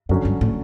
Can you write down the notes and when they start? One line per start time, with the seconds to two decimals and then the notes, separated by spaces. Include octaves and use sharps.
0.09 F#2 D3 F#3 C#4
0.25 G2
0.41 A2